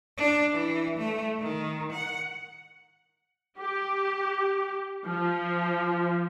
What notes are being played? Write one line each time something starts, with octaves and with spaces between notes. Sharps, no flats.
D4
E3
A3
D#3
F#5
G4
F3